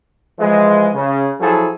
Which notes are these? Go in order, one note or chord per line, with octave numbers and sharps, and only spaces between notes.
E3 F3 G#3
C#3
F3 F#3 E4 G#4 A4